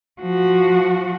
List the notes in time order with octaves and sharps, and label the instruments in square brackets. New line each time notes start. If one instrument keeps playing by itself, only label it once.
[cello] F3 F#4